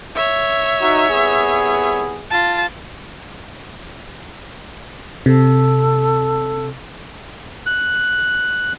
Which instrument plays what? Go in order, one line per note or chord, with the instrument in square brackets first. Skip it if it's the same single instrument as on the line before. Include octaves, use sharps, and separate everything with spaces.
[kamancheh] C#5 E5
[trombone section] D#4 F#4
C2 B3 G#4
[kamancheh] F4 A5
[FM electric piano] C3 [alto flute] A4
[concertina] F#6